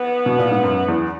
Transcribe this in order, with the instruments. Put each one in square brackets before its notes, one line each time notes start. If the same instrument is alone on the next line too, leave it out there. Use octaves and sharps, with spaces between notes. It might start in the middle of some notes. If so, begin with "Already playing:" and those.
Already playing: [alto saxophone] B3
[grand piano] B2
A#2
G#2
F#2
E2